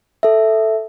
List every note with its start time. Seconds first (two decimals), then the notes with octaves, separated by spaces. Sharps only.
0.23 A4 E5